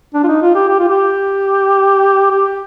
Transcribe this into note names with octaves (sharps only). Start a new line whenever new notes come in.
D4
F4
D#4
F4
G4
G4
F4
G4
G4